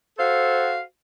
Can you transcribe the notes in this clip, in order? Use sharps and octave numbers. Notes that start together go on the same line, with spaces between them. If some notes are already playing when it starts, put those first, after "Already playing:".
F#4 A4 C5 F5